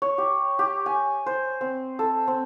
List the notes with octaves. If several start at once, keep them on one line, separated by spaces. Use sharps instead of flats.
C#5
G4
G4
G#5
C5
C4
A4
C4